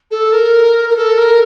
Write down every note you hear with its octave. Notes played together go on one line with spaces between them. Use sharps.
A4
A#4
A#4
A4
A#4